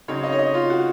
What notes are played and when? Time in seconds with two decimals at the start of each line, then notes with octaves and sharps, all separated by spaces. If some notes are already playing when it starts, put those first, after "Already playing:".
0.08 C#3 F#3 C4 D#4 C#5
0.24 D#5
0.32 C#5
0.39 D#5
0.54 F4
0.70 F#4